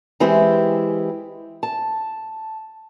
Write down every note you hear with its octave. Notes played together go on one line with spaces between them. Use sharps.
E3 G#3 C4 E4 G4
A5